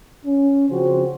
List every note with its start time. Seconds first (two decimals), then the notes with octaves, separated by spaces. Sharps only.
0.25 C#4
0.69 C#3 F3 C4 F#4 C5